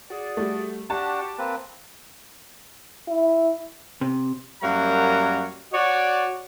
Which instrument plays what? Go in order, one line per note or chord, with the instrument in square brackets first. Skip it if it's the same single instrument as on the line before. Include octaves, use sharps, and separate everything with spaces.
[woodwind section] F#4 G#4 D5
[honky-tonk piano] G3 A3
[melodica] D4 F#4 F#5 [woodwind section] G4 [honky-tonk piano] A5
[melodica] A#3 C4 B4
[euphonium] E4
[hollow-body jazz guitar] C3
[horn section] F#2 G3 A#3 C#5 F#5 A#5
F#4 C#5 D5